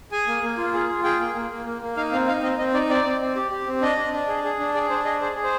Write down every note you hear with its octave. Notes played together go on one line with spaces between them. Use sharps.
G#4 G#5
A#3
A#3
F4
G#4
F4
G#4 G5
A#3
A#3
A#3
A#3
A#3
D#4 F5
C4 F5
D#4 F5
C4 D#5
C4 D#5
D#4 D5
C4 D5
C4
C4
G4
G4
C4
D4 D#5
D4
D4
G#4
G#4
D4
G#4 D5
D4 C5
G#4 D#5
G#4 C5
G#4
C5